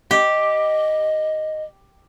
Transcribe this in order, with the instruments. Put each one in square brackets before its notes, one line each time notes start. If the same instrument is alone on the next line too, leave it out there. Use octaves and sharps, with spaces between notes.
[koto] G4 [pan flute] D#5